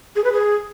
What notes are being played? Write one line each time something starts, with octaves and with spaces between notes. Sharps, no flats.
G#4
B4
G#4